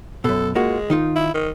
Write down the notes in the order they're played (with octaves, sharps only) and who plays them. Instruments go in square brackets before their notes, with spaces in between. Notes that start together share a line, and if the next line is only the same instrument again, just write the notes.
[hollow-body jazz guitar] F#2 B2 [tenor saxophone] A4
[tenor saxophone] G#3 [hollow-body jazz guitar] A#3 F4 F#4
[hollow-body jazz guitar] D#3 D#4 F4
[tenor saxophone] E4
D#3